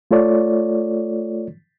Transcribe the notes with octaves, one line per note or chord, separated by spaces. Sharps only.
A3 F4 A4 C#5 D5